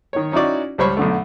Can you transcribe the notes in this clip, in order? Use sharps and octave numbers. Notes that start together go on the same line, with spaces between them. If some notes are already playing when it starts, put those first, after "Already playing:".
D#3 C#5
C#4 D#4 E4 F#4 D5
C#2 G3 C5 C#5 B5 C#6
B1 D3 A3